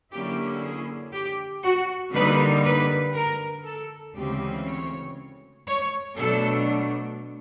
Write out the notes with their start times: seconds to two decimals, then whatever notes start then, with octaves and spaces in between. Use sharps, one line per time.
0.12 D3 F#3 A#3 C#4 E4 G4
0.63 G#4
1.13 G4
1.64 F#4
2.14 D3 G3 A#3 D#4 B4
2.65 B4
3.15 A#4
3.65 A4
4.15 D2 C#3 E3 G#3 C4 G4
4.66 C#5
5.67 C#5
6.17 B2 F#3 A3 D4 A4